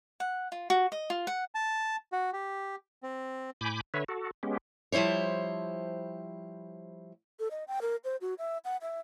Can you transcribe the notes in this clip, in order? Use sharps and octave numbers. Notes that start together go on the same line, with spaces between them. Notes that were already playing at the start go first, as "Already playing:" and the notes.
F#5
F4
F#4
D#5
F4
F#5
A5
F#4
G4
C4
A2 G#5 B5 D6 G6
D3 B4 C#5 E5
F#4 A4
G#3 B3 C#4 G4
F3 G3 E4 C5 C#5
A4
D#5
G5
A#4
C5
F#4
E5
F#5
E5